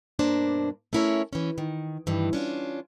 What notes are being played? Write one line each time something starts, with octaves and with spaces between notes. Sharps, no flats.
G2 B2 A#3 D4 C5
A3 C#4 E4 A#4 C#5
E3 C#4
D#3
G2 D#3 E3
C#4 D4 F4